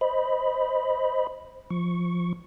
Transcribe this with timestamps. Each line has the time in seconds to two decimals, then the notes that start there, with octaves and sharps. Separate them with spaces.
0.01 C5 D#5 B5
1.70 F3 C#6